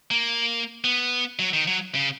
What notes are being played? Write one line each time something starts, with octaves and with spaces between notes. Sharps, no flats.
A#3
B3
F#3
D#3
F#3
C#3